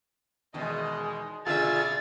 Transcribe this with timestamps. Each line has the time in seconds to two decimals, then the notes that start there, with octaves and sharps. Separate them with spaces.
0.54 E2 B2 D#3 G#3 D#5
1.47 B2 D3 F4 G#4 E5 E6 A6